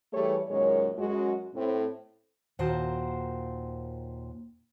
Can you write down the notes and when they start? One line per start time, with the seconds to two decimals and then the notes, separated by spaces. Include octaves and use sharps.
0.13 E3 G3 A3 G4 G#4 C#5
0.49 F#2 A#2 D#3 G#3 C#5
0.98 F#2 G#3 F#4
1.55 A2 C4
2.59 D#2 A#2 F#4 C5 G5 A5